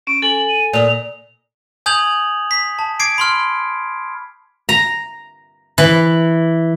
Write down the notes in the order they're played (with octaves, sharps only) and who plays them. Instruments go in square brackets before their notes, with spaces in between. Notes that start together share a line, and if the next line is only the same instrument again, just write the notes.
[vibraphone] C#4 [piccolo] D7
[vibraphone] A4 G#5 [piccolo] F#7
[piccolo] D#7
[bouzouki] A#2 D#5 [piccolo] F7
[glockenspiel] G#5 D#6 G6 G#6 F7 F#7
B6
A5
D6 G#6 C7 D7
B5 C6 F6
[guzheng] A#5
E3